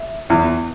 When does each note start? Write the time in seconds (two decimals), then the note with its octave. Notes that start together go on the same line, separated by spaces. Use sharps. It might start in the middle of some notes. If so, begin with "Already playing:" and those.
Already playing: E5
0.30 E2